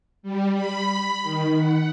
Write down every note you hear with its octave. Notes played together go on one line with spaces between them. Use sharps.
G3
B5
D#3
F#5